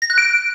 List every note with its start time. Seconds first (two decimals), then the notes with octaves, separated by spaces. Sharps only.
0.02 A#6
0.10 F#6
0.18 D7